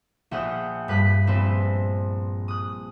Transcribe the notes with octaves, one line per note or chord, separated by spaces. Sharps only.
A#1 E5 F#5 G5 D#6 F6
G2 B4 F#6 B6
A#1 C4 B4 E6
D#6 F#6